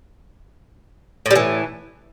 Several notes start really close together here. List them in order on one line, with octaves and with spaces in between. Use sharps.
A2 G3 E3